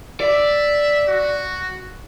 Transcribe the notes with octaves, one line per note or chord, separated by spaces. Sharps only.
D5 E5
F#4